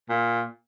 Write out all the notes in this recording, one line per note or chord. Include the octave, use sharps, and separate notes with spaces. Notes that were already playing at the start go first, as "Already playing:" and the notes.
A#2